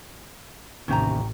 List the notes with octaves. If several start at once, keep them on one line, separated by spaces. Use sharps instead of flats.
A1 D#2 C3 C#4 G4 A#5